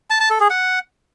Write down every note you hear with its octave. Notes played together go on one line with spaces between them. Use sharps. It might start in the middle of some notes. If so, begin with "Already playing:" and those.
A5
A5
A4
G#4
F#5